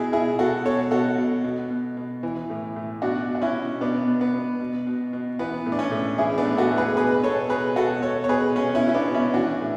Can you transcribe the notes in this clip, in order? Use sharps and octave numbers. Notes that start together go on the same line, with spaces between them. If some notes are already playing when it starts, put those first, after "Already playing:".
Already playing: B2 E4 G#4
B2 E4 G#4
B2 F#4 A4
B2 A4 C#5
B2 F#4 A4
B2
B2
B2
B2
E3
A2
A2
B2 D4 F#4
B2
F#4
C#4 E4
B2
B2 B3 D4
B2
B3
B2
B2
B2
B2
E3 B3
A2
D4
C#4
A2
E3 E4 G#4
B3 D4
A2
F#4 A4
A2
G#4 B4
B2 G#4 B4
B2 A4 C#5
B2 G#4 B4
B2 F#4 A4
B2 A4 C#5
C#5
B2 G#4 B4
B2 C#4
C#4 E4
B2
E4
B3 D4
B2
C#4 E4
E3 D4 F#4
A2